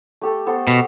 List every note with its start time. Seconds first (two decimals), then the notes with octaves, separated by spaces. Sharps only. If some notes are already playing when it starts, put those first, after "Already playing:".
0.21 A3 G4 A4
0.46 B3 A4 C5
0.67 B2